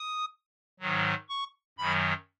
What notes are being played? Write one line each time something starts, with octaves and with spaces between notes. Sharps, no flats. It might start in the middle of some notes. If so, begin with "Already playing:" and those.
Already playing: D#6
G#2 D#3 F#3
C#6
F#2 D#3 F#3 B5